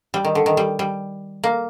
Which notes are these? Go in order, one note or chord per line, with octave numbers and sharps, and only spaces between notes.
G3
D#3
D3
D#3
G3
G3
A#3